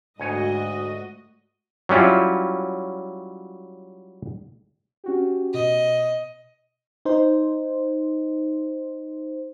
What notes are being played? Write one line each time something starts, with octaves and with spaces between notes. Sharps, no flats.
D2 G#2 A3 F#4 C#5 D#5 G#5
F#3 G3 C#4 E4 F4
C#4 F#4 G4
B2 D#5
D#4 C5